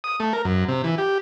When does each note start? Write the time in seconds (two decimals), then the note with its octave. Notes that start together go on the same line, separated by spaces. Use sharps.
0.04 D#6
0.20 A3
0.33 A#4
0.45 F#2
0.68 C3
0.84 E3
0.98 G4